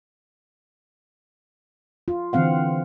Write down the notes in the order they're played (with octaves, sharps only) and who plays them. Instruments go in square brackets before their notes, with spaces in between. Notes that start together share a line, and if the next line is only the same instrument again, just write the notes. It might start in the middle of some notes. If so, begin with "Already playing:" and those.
[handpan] F4
D3 E3 C4 F5 F#5